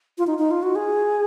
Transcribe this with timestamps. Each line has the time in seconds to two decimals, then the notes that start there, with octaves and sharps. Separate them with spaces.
0.18 F4
0.27 D#4
0.39 D#4
0.51 F4
0.63 F#4
0.75 G#4